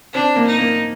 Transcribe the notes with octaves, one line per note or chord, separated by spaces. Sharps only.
C4 D4
A#3
D#4
A#3